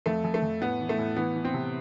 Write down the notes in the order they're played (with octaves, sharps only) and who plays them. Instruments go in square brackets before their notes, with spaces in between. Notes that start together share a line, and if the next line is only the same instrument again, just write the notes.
[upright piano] F2 A3
F2
A3
F2
A2 B3
E3
A3
A2
E3 B3
E3
C4
C3